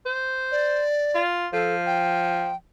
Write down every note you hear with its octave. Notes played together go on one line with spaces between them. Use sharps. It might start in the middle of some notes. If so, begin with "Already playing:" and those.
C5
D5
F4
F3 A4
G5